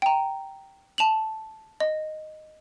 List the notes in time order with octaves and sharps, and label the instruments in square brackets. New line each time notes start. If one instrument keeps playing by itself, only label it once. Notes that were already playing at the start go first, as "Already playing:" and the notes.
[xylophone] G5 A#5
A5 F7 F#7
D#5